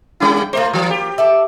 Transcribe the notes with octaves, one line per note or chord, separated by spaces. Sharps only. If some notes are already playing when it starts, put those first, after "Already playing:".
G3 C#4 E4
G5
A3 A#3 E4 F4 C5
E3 F#3
G4
A4 D5 E5